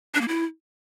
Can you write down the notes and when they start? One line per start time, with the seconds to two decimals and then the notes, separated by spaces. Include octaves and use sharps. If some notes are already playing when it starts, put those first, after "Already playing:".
0.15 D4
0.21 A#3
0.28 E4